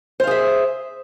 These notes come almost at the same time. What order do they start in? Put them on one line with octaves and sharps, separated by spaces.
C5 F5 G#4 E5